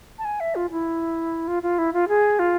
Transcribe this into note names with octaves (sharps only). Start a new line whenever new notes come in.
A5
G#5
E5
F4
E4
F4
F4
E4
F4
G#4
F4